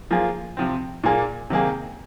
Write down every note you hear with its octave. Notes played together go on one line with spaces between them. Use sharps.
F3 A#3 F4 G#4
C3 F3 C4
A#2 A#3 G#4
C3 D#3 A#3 G#4